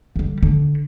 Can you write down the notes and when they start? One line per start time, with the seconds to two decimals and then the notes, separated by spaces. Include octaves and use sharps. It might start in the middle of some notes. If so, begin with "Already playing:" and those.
0.16 D3 G3
0.43 D3